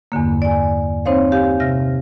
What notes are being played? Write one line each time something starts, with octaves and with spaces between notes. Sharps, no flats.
E2 G2 D3 A#3
D5 G#5
C4 D#4 C5 C#5 F5
G4 F5 G#5
C3 E5 F6 A#6